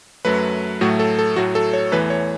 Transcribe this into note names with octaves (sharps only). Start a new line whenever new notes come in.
F#2 F#3 A3 B4
A2 F#3 A3 F#4
A4
A4
A2 F#3 A3 F#4
A4
C#5
E2 E3 A3 B4
C#5